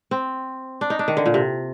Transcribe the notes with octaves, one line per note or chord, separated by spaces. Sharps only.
C4
D4
D#4
D4
D#3
D3
A#2
C3